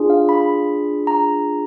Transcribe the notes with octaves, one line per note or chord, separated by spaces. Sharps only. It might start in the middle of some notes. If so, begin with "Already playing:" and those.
Already playing: D4 F4 G#4
F5
B5
A#5